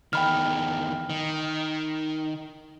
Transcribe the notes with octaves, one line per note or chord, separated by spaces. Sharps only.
E2 D#3 G5 B5 F6
D#3